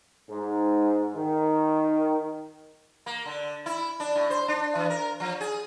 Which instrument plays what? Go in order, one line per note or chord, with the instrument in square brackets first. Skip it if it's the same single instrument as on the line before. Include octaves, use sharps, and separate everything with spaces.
[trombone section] G#2
D#3
[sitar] A#3
D3
E4
D4
A2
C5
D4
E3
A#4
F3
G#4